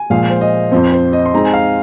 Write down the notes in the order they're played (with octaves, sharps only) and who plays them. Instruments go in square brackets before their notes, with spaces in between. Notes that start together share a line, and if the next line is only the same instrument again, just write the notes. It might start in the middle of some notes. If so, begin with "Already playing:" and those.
Already playing: [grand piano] G#5
[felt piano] A#2 F3 G#3 [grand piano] F5
[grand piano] C5
D#5
[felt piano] F2 F3 C4 [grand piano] C5
[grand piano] C5
D#5
C6
[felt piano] G#3 C4 D#4 G#4 [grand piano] A#5
[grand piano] G#5
F5